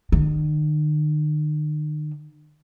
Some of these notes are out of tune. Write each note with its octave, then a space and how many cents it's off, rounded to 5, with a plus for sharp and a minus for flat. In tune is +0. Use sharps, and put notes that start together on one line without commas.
D#3 -45